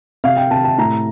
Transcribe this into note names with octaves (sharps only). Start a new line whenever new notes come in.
C3 F5
G5
C3 A5
A5
A2 A#5